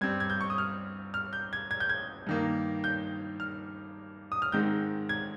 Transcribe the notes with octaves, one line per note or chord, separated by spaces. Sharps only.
G2 G3 C4 G#6
G#6
G6
C#6
D#6
F6
F6
G6
G#6
G#6
G6
G#6
G2 D#3 A#3
G6
F6
D#6
F6
G#2 D#3 G#3 C4 G6
G#6